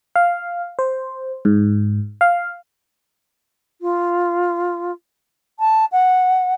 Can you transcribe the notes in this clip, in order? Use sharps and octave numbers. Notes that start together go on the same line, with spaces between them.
F5
C5
G#2
F5
F4
A5
F#5